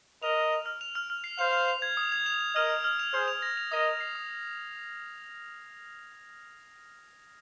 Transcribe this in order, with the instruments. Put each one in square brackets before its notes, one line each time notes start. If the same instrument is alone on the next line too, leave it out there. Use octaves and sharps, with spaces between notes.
[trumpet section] A#4 D#5 [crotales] F7
[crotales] F6
F7
F6
F7
F6
F6
C7
[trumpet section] C5 F5 [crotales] F7
[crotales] F7
F7
G#6
D#6
G#6
F7
F7
[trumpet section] A#4 D#5 [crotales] F6
[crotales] F6
F6
F7
[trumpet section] G#4 C5 [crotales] F6
[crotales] F7
A#6
F7
[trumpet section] A#4 D#5 [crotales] D#6
[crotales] D#6
C7
D#6